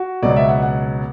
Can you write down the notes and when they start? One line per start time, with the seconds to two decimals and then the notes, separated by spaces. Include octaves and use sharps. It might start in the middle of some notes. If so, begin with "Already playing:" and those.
Already playing: F#4
0.23 C#2 B2 F#3 D5
0.36 E5
0.49 F#5
0.62 F#5